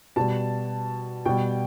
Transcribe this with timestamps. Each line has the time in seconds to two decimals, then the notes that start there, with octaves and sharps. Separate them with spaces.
0.16 B2 G3 A5
1.26 B2 G3 G5